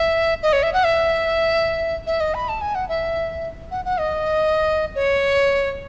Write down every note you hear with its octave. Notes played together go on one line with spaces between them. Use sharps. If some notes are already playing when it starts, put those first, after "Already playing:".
Already playing: E5
D#5
C#5
E5
F#5
E5
E5
D#5
B5
A5
G#5
F#5
E5
F#5
F#5
D#5
C#5